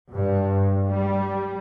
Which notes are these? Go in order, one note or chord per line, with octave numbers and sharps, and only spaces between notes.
G2
G3